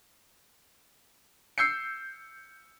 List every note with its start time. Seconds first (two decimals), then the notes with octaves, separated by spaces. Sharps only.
1.58 E6 G6 C7 C#7